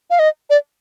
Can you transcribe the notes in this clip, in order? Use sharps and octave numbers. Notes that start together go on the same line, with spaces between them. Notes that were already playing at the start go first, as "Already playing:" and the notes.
F5
D#5
D5